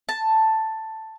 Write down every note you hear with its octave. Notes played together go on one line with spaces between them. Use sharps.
A5